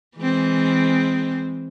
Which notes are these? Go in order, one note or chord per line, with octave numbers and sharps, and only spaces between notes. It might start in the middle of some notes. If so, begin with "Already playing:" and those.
E3 G#3 C4